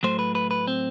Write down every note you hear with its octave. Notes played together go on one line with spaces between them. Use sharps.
A2 F#3 A3 C5
B4
B4
B4
C4